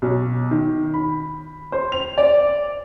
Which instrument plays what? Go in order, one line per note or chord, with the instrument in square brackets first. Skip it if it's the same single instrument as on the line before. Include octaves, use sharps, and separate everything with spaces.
[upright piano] B1
D#3
B5
C5
F7
D5